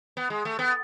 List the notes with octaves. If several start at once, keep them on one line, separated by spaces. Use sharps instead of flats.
B3
G#3
A3
B3